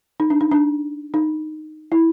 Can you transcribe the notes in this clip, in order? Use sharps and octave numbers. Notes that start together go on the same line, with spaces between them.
D#4
D4
D#4
D4
D#4
E4